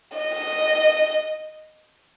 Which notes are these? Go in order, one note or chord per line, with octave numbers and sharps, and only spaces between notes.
D#5